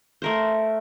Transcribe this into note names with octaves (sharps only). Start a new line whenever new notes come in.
A3 A#4 C5